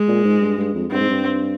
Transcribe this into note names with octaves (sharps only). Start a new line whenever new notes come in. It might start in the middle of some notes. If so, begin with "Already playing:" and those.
Already playing: G#3
A#2
G#2
G2
G2
F2
G2 C4
G#2
G2